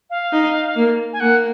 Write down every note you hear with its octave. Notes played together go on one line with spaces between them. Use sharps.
F5
D#4
A#3
G#5
A#3 F#5